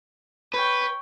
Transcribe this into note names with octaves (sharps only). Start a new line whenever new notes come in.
B4 C#5 G5